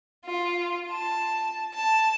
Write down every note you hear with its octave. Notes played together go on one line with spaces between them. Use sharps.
F4
A5
A5